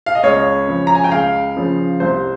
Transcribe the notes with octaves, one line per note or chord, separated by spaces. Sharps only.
F5
D#5
C#2 C#5
C#3 F3
A#5
G#5
G5
C#2 F5
C#3 F3
C2 C5